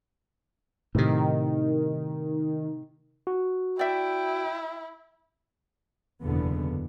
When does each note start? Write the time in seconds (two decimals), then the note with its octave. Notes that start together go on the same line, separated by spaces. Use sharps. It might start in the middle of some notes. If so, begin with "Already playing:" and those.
0.95 A2 C3 D#3
3.27 F#4
3.79 E4 D5 E5 G5
6.22 F#1 E2 B2 D3 B3